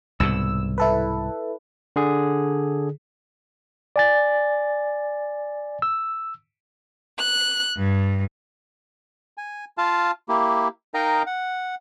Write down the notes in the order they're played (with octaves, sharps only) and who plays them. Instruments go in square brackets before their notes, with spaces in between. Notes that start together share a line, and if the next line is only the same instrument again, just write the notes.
[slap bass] C2 G#2 B2 [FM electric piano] E6
[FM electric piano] E4 A4 B4
[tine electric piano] D3 G#4
D5 G#5 A6
E6
[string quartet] F#6
G2
[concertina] G#5
F4 F5 A5
A#3 E4 G4
D#4 A#4 D#5 F5 G5 A#5
F#5